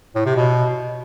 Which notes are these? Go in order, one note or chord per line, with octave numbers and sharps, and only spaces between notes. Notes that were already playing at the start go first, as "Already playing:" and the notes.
A2
C3
B2